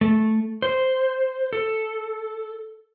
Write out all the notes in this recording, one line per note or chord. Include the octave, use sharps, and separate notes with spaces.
A3
C5
A4